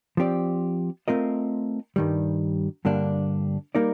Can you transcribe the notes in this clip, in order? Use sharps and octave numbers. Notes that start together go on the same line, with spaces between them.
F3 C4 G4 D5
A3 C4 F4 A#4 D#5
G2 D#3 G3
G2 D3 G3 A#3 D4
G3 A#3 D#4 A#4 D5